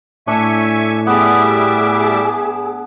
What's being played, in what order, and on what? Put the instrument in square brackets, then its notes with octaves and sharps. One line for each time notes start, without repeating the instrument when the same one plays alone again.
[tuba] A2 [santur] D4 [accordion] E5 G#5 C#6
[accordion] G3 E5 D6 [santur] B3 [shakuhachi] G#4